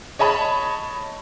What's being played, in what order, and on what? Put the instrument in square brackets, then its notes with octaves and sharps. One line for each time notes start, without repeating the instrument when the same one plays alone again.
[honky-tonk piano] C#5 D#5 A5 B5